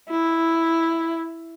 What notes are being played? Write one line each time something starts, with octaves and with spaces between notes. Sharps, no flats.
E4